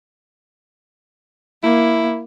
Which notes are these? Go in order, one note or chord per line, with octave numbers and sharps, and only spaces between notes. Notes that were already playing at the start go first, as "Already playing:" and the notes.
A#3 E4